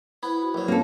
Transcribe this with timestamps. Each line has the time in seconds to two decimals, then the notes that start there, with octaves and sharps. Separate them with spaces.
0.23 B3 E4 C5 B5 G#6
0.42 F#4
0.54 A#1 F#3 B4
0.68 A#3 C4 C#4 A4